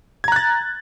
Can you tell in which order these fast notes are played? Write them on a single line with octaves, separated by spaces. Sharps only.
G#6 A#5 F#6 A6